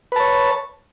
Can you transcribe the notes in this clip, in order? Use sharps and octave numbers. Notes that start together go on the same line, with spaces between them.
B4 C#5 A5